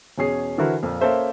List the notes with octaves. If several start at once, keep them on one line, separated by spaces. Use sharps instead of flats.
E2 B2 C#4 G#4 C7
D3 E3 E4 F#4 A#4 C5
F2 A#2 A#3
A#3 C#4 A4 C5 E5